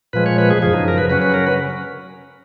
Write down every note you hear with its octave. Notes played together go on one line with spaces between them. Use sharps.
A#2 F3 G#3 B4
C#5
B4
G#4
F#2 C#3 F3 G#4
D#4
A#4
B4
C#3 F#3 C#4 B4
B4
A#4
B4